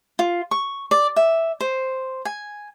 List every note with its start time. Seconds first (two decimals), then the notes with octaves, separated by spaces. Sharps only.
0.19 F4
0.51 C#6
0.91 D5
1.16 E5
1.60 C5
2.25 G#5